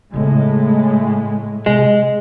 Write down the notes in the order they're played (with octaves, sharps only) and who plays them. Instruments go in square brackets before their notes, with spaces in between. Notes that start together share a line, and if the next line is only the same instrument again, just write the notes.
[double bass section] A2 G#3 [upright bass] C#3 B3
[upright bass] C3 [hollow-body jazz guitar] G#3